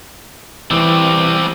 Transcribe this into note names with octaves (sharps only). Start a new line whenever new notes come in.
E3 G3 C4